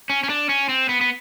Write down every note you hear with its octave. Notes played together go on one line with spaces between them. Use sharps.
C#4
C#4
D4
C#4
C4
B3
B3